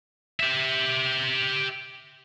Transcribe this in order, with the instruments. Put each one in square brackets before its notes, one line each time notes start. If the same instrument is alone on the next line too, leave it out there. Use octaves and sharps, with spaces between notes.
[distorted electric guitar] G4 E5